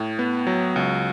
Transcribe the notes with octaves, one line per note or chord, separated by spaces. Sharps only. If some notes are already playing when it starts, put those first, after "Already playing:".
Already playing: A2
B3
F#3
C#2